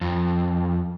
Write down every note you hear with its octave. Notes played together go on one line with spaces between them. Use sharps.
F2